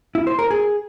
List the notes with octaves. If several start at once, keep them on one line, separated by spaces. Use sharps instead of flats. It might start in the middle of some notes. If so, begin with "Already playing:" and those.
E4
C5
A#4
G#4